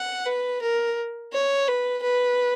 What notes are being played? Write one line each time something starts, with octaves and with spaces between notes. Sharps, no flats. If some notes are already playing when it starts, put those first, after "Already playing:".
Already playing: F#5
B4
A#4
C#5
B4
B4